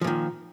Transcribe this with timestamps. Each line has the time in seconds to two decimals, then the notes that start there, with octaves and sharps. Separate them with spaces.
0.01 F3
0.04 A#2
0.07 D#3